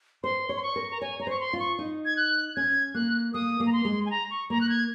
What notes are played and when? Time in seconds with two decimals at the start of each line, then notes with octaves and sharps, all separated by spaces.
0.24 C5 C6
0.49 C#5
0.56 C6
0.63 C#6
0.76 A#4
0.92 A#5
1.01 C#5 G#5
1.20 C#5 A#5
1.27 C5 C#6
1.40 C6
1.53 F4
1.59 C#6
1.79 D#4
2.05 G#6
2.17 F#6
2.56 C#4 G#6
2.94 A#3 F#6
3.34 A#3 D#6
3.60 A#3
3.66 A#5
3.73 C6
3.85 G#3
4.06 G#5
4.11 A#5
4.31 C#6
4.50 A#3 A#5
4.61 F#6
4.69 G#6